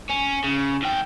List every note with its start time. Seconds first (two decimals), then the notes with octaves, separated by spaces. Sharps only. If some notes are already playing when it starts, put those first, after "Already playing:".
0.09 C#4
0.44 C#3
0.82 G#2 G5